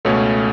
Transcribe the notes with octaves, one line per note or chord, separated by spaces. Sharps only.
C#2 B2 A3 C#4 A4 C#5